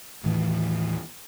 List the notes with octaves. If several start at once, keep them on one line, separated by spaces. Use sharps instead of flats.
D#2 A2 E3